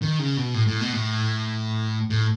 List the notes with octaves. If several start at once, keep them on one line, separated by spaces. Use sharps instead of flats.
D#3
C#3
B2
A2
A2
B2
A2
A2